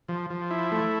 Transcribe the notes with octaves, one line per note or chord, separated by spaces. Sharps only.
F3
F3
E4
A3